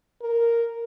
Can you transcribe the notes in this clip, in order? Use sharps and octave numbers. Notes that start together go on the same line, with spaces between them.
A#4